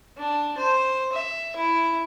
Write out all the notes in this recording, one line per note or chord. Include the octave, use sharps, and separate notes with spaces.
D4
C5
E5
E4